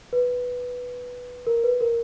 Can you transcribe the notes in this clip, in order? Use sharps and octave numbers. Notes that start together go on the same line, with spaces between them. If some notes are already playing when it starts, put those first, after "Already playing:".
B4
A#4
B4
A#4